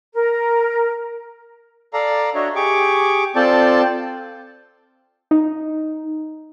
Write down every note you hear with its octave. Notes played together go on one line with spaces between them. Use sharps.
A#4
A4 D5 F5 A#5
D4 F#4 C#5 D#5 E5
G4 G#4 C#6 D6
C4 F4 A4 D5 G5 A5
D#4